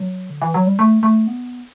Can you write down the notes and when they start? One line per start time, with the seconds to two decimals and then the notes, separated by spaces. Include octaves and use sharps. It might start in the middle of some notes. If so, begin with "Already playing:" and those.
Already playing: F#3
0.30 D3
0.42 E3
0.54 F#3
0.66 G3
0.79 A3
1.03 A3
1.27 B3